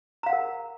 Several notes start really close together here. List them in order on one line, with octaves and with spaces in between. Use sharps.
A#5 F5 F#5 A#4